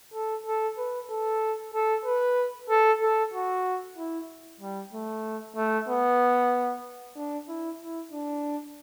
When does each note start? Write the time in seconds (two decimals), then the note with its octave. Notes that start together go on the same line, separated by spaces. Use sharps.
0.14 A4
0.46 A4
0.78 B4
1.10 A4
1.74 A4
2.05 B4
2.70 A4
3.01 A4
3.33 F#4
3.97 E4
4.61 G3
4.93 A3
5.56 A3
5.89 B3
7.16 D4
7.48 E4
7.80 E4
8.12 D4